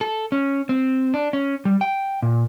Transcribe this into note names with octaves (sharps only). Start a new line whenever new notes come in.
A4
C#4
C4
D4
C#4
G3
G5
A#2